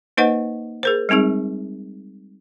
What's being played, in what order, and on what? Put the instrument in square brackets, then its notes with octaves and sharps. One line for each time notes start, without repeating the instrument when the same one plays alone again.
[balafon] A#3 D#4 B4 C5 D#5 F#5
G#4 A#4 C5
G3 G#3 C4 D#4 G#4